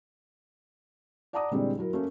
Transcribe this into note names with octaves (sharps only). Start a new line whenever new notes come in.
D5 F#5 A5 A#5 D6 D#6
A#2 D3 E3 G3 G#3 C4
F#3 E4 A#4
A3 A#3 C#4